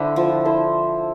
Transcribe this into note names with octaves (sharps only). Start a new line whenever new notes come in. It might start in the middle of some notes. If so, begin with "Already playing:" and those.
Already playing: D3 D4 E4 A4 C5
F3
E4 A4 C5